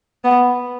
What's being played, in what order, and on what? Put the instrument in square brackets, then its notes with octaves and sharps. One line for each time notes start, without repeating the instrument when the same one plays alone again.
[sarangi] B3